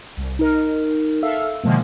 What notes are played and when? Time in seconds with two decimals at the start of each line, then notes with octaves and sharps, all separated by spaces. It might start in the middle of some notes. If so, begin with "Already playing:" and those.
0.17 C2
0.39 D#4 A#4
1.23 A4 E5 F5 E6
1.64 B2 D3 D#3 F3 G#3 A#3